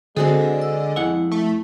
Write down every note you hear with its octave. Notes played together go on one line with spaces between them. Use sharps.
D3 G#3 C4 F#4 G#4 A4
E6
F2 E4 F#5
A3